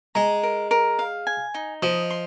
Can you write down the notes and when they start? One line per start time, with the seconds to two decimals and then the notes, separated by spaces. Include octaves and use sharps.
0.15 G#3 A#5
0.43 A#4
0.71 A#4
0.99 F5
1.27 G#5
1.54 D#4
1.82 F3 D#5
2.10 C6